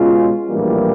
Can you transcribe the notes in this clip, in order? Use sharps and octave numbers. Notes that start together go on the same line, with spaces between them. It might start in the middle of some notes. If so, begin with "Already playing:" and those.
Already playing: B2 G#3 C#4 F4
A#1 A2 E3 G3 A#3